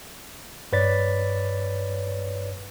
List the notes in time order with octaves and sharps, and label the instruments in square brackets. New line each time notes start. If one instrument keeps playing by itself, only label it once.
[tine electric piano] G2 B4 C#5 D5 A6 B6